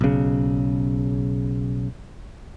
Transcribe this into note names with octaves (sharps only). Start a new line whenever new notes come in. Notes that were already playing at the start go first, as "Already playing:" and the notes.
B1 C#3